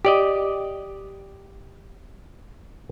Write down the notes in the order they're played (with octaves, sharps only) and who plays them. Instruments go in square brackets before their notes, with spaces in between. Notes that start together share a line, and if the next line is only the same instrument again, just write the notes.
[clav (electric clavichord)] G4 D5 D#5